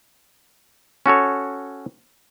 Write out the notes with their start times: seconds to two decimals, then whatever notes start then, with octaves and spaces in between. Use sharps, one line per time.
1.06 C#4 F#4 A4 C#5